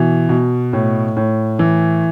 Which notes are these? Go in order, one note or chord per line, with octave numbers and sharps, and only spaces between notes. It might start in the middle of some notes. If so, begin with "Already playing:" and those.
Already playing: B2 E3
B2
A2
A2
E3